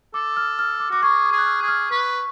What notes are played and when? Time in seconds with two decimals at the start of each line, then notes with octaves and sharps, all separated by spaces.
0.14 A4 D6
0.37 F6
0.59 F6
0.80 D6
0.91 F#4 D6
1.02 G#4 C#6
1.24 D6
1.32 G#4
1.38 F#6
1.46 F6
1.62 G#4
1.68 F6
1.91 B4 C#6